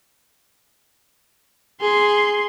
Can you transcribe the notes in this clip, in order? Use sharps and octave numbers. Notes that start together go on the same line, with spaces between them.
G#4 C6